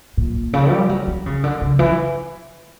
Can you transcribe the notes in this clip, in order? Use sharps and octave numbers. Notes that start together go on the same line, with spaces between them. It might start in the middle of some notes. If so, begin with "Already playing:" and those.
A#2
C#3
G3
F#3
E3
C#3
D3
C#3
E3